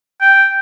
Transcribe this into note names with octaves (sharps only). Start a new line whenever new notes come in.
G5